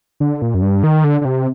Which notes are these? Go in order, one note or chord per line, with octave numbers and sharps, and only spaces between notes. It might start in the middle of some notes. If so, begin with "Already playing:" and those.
D3
A#2
F#2
G2
D#3
D3
D3
C3